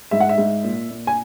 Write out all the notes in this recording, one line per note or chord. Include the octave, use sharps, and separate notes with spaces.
G#2 E5
F#5
E5
G#2
A#2
A#2
G#5